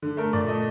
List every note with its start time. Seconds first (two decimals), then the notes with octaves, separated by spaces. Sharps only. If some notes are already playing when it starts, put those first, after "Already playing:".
0.02 D3
0.17 A3 A#4
0.33 A#2 D5
0.48 A3 D#5